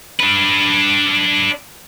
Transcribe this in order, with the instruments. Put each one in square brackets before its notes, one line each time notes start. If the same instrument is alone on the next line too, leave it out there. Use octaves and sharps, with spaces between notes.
[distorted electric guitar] D4 B4